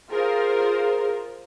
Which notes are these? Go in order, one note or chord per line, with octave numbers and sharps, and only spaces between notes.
F4 G#4 A#4 C5